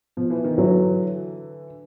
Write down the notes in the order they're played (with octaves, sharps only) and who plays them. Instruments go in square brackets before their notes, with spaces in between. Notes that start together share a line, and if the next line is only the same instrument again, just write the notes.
[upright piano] B2 [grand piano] F3
[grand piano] E3
D#3
[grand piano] D3 E3 [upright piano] F#3